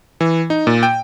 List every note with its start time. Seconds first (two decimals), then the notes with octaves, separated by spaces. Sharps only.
0.21 E3
0.50 D#4
0.67 A#2
0.83 G5